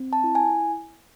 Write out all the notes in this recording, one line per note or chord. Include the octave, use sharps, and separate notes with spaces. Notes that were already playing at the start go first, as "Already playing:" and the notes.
Already playing: C4
A5
E4
G#5